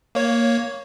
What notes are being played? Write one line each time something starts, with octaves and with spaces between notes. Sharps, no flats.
A#3 C#5